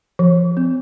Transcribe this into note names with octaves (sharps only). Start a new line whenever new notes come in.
F3
C4